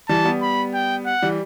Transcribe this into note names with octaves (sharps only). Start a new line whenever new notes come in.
E3 G3 A5
G3 B3
B5
G5
F#5
E3 G3